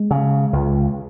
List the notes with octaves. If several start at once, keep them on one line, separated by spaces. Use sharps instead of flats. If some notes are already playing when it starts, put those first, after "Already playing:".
Already playing: G#3
C#3
C#2